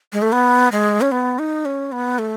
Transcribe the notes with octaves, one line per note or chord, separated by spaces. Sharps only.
G#3
A3
B3
G#3
C#4
B3
D#4
C#4
B3
A3